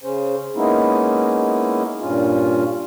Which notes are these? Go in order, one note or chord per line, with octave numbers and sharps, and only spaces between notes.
C#3 C#4 C5
G#3 A#3 B3 C#4 D#4 E4
G2 A#2 C#4 F4